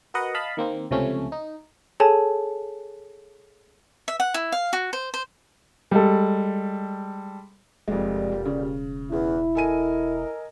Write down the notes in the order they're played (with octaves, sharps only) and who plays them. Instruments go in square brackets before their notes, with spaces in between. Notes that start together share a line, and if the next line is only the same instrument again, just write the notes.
[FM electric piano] F#4 A#4 B4 D#5 F#5
D#5 F5 A5 B5
D#3 A#3 C4
C#2 C3 F3 A3 C#4
D#4
[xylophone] G#4 A4 C#5 G#5 A5
[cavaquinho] E5
F#5
E4
F5
F#4
C5
C5
[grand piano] G3 G#3 A4
[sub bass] E1 [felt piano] F2 G#3 [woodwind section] A#2 D3 G3
[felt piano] C#3
[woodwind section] E2 [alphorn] E4
[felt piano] A4 G#5 D#7 [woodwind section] A#4 D#5